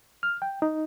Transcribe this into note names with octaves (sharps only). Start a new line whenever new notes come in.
F6
G5
D#4